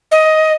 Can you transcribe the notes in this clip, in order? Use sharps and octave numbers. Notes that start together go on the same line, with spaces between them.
D#5